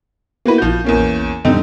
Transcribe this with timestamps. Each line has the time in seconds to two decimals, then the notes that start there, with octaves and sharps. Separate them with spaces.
0.46 A#3 B3 E4 F#4 B4
0.58 A#1 F3 F#4 G6
0.84 E2 A#3 C#4
1.45 F2 A2 D3 G3 C4 D#4